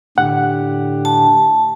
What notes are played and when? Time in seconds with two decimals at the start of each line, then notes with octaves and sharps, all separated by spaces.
0.18 A2 D3 G4 F#5
1.05 A5